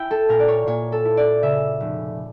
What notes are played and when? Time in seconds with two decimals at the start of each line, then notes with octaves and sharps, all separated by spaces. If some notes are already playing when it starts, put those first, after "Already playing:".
Already playing: E4 G5
0.11 A4
0.29 A#2 A#4
0.40 D5
0.48 C#5
0.67 A#2 C#5
0.92 A4
1.05 E4
1.17 D5
1.42 C#3 E5
1.80 F1